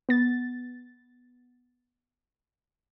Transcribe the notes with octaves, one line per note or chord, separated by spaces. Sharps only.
B3 A6